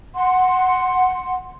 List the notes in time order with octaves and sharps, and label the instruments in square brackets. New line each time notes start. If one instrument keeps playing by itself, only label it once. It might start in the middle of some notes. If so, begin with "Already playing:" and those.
[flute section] F#5 C6